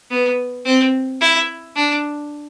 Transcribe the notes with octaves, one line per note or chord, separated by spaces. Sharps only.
B3
C4
E4
D4